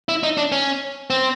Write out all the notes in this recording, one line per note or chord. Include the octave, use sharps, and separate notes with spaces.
E4
D#4
D4
C#4
C4